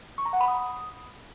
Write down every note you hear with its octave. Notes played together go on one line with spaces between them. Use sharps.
C#6
A#5
F#5
B5
D#6